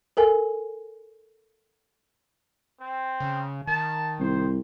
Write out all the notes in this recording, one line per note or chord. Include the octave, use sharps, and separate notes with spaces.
A4 A#4 G#5
C4
C#3
D#3 A5
C2 C5